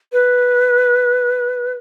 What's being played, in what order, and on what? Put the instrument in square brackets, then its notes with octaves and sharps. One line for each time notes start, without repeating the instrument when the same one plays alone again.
[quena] B4